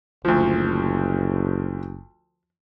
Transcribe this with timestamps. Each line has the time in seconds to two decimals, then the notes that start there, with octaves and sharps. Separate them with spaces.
0.25 F#1 D2 F3